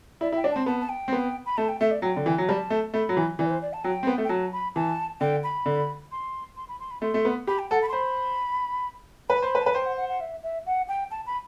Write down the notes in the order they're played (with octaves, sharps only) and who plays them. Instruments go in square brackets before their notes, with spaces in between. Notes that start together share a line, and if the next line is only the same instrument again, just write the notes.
[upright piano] E4 [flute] D5
[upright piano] E4
[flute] G5
[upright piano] D4
[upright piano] C4 [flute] A5
[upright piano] B3 [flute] A5
[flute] A5
G5
[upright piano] C4
B3
[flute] B5
[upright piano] A3 [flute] A5
[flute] G5
[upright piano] A3 [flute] E5
[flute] D5
[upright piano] F#3 [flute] G5
[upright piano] D3
E3
F#3
[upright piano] G3 [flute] A5
[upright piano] A3
[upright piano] A3 [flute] B5
[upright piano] F#3
E3
[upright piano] E3 [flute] D5
[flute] B4
C5
D5
A5
[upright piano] F#3 [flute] G5
[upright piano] C4
B3
A3
[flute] G5
[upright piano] F#3 [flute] A5
[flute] B5
[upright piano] E3 [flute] A5
[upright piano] D3 [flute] G5
[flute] B5
[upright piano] D3
[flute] C6
C6
B5
C6
B5
[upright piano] A3 [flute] C6
[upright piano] A3
B3
[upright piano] G4 [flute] B5
[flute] G5
[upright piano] A4 [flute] F#5
[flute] B5
C6
[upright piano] C5 [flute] B5
[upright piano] B4 [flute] B5
[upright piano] C5 [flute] B5
[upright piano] B4
[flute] A5
[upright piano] B4
[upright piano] C5 [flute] G5
[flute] F#5
F#5
F#5
E5
E5
F#5
G5
A5
B5